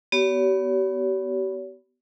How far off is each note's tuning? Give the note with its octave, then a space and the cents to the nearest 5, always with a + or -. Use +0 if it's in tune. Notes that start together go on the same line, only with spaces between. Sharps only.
B3 +0 G4 -40 C#5 +40